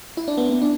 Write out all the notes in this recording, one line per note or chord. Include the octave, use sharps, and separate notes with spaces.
E4
D4
B3
B3
D4